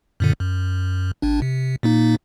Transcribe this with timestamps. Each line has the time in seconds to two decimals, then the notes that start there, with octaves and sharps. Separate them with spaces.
0.20 F#2 A#2 D3
0.40 F#2
1.22 G#1 D4
1.42 C3
1.83 A#2 A#3 D#4